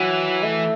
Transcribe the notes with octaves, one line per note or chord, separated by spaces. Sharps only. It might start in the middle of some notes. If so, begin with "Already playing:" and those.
Already playing: E3 F#3
A3